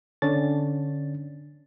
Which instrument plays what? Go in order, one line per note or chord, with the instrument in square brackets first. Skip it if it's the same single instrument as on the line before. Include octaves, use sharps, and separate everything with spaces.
[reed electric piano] D3 C#4 D4 A6